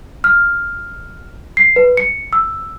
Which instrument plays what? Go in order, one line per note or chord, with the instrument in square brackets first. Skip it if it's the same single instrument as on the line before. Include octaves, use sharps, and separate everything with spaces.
[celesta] F6
C7
B4
C#7
E6